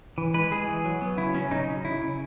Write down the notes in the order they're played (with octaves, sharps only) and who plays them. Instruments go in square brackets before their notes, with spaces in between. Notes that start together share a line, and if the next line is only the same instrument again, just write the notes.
[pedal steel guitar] E3
G#3 B4
G#3 G#4
E3
F#3
B3
C#3 E4
F#3 C#4
C#3 D#4
C#3
C#3 E4
C#3